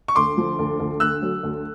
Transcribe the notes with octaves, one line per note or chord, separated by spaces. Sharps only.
C#6
D2 C6 D6
F3
D2
D2
D2 E6 F#6
F#3
D2